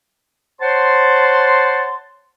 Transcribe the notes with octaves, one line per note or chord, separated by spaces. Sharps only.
C5 C#5 F#5 A5 C6